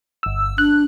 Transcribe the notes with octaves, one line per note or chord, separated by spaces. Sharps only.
G1 E6
D4 F#6